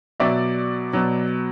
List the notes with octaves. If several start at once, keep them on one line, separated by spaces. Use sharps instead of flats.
B2 F#3 D5 E5
B2 F#3